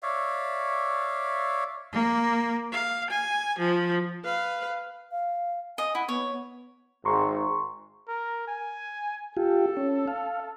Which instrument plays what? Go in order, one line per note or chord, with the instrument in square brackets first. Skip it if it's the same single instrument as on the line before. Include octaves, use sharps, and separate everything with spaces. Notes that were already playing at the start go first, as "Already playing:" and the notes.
[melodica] C#5 D5 E5 F5
[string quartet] A#3
F5
G#5
F3
[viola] B4 F5
[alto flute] F5
[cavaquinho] D#5 [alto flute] G#5
[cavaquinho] E4 [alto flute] F#5
[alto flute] B3 [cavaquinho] C#5
[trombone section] G#1 G#2 [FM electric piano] A#5 C6 C#6
[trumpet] A#4
G#5
[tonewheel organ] F4 G4 [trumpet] A4
[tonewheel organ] C#4
F5